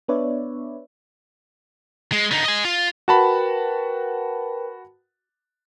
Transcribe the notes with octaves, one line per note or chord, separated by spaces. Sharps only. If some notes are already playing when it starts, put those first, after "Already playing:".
B3 D4 B4 C#5 D5 E5
G#3
D3 D#4
D#5 G#5
F4
F#4 A#4 B4 G5 A5 B5